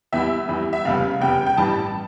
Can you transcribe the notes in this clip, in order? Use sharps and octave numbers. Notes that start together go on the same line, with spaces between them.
E2 E3 G3 E5
E2 E3 G3
E5
F1 E2 C#3 G3 F5
F1 E2 C#3 G3 G5
G5
A1 G2 E3 G3 A5